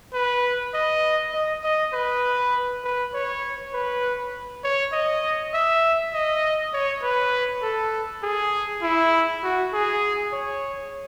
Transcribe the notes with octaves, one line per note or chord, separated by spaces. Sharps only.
B4
D#5
D#5
D#5
B4
B4
C#5
B4
C#5
D#5
E5
D#5
C#5
B4
A4
G#4
E4
F#4
G#4
C#5